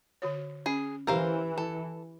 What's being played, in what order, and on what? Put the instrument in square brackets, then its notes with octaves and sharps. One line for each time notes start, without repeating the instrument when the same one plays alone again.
[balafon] D3 F#4 C#5
[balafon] C#4 [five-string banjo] G#4
[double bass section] E3 [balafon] G4 [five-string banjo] A#4 C5 F5
[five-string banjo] A4